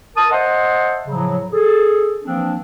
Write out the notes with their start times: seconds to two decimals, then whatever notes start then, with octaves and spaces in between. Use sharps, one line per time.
0.17 A#4 A5 D#6
0.31 C5 D#5 E5 F#5 A5 C6
1.07 A2 C#3 F3 F#3
1.52 G#4 A4
2.24 E3 F3 A#3 C4 D4